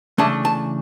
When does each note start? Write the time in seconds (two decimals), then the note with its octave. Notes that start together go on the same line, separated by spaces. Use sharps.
0.18 C#3 E3 A3 D4 A5
0.45 A5